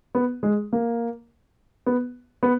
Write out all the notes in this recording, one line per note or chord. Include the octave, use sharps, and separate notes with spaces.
B3
G#3
A#3
B3
B3